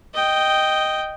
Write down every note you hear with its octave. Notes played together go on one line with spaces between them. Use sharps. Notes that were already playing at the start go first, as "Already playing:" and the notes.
D#5 G5